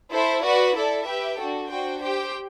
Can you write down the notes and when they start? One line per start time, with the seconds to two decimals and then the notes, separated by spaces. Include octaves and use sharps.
0.11 E4 A4 C5
0.42 F#4 B4 D5
0.75 E4 A4 D5
1.06 G4 B4 E5 G5
1.37 D4 F#4 A4
1.69 D4 F#4 C5 G5
2.01 G4 C5 G5